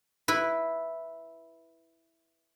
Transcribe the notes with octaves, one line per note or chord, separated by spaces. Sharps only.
E4 B4